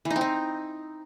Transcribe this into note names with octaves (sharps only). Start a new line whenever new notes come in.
E3
D#4
C4
D#4